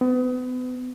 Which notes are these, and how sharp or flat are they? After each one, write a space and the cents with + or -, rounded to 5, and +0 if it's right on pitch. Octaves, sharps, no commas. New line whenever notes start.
B3 +35